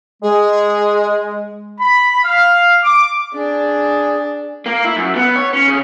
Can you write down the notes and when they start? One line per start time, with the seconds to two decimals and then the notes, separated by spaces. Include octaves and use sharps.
0.23 G#3 G#4
1.79 B5
2.24 F5
2.84 D6
3.34 D4 G#4
4.66 A#3
4.85 E4
4.96 F#2
5.16 B3
5.36 C#5
5.53 C#4
5.67 C#3